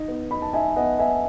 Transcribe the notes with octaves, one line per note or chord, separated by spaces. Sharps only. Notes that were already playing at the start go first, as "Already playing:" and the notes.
Already playing: D#4
B3
D#4 B5
A5
D#4 E5 G#5
B3 D#5 F#5
B3 E5 G#5